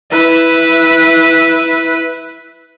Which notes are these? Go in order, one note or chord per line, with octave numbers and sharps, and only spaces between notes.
E4 B4